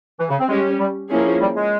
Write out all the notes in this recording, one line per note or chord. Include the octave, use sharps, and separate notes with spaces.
E3
C#3
C4
G3 G#3 C#4 G4
G3
F3 A#3 C#4 E4 G#4
G3
G#3